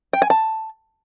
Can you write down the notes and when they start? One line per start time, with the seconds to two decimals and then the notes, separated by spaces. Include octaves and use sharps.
0.13 G5
0.22 G#5
0.30 A5